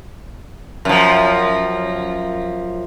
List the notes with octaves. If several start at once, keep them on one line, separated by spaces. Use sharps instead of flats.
F#2 F3